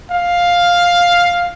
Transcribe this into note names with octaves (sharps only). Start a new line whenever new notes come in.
F5